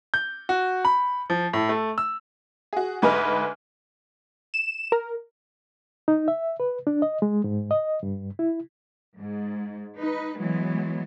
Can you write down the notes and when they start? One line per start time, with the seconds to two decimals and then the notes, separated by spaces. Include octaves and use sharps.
0.14 G6
0.49 F#4
0.85 B5
1.30 F3
1.53 A2
1.69 A3
1.98 E6
2.73 F#4 G#4
3.02 D2 G#2 B4 D#5 G#5 F6
4.54 E7
4.92 A#4
6.08 D#4
6.28 E5
6.60 B4
6.87 D4
7.02 D#5
7.22 G#3
7.44 G#2
7.71 D#5
8.03 G2
8.39 E4
9.19 G#2
10.00 D#4 B4
10.37 E3 F#3 G#3 B3